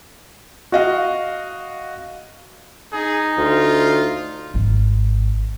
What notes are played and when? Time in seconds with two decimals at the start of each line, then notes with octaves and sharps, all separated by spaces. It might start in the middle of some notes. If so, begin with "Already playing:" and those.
0.72 F#4 D#5 F5
2.93 D#4 G#4
3.37 D2 F4
4.54 G#1 D#3